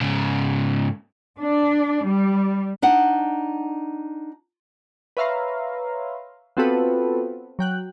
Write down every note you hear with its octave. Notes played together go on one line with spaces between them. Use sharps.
G#2 C#3
D4
G3
D4 D#4 F#5
B4 C#5 E5 F5 A#5 C6
B3 C4 F4 F#4 A4 B4
F#3 G5 F#6